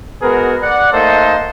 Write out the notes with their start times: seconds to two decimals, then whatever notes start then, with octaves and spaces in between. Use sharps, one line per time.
0.22 G#3 B3 F#4 G#4 A#4
0.63 D5 F#5
0.93 A3 A#3 D#4 A4 C5 D#5